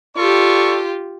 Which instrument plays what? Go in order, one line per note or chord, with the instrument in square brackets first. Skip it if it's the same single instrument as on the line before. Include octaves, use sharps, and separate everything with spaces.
[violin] F4 G4 [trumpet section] A4 D5 C#6